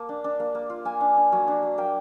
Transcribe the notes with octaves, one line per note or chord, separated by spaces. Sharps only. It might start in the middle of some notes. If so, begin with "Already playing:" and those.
Already playing: A#3 A5
D4
D4
A#3
A#3
F4
A#3 G#5
D4
D4
F#3
D4
F#3
A#3 G5